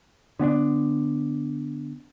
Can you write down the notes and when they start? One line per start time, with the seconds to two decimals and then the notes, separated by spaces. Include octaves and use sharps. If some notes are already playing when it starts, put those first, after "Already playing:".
0.39 D3 B3 C#4 D4